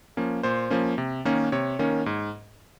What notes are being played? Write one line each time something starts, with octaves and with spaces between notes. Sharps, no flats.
F3 A#3 C#4
A#2 C5
F3 A#3 C#4
C3
D#3 A#3 C#4
C3 C#5
D#3 A#3 C#4
G#2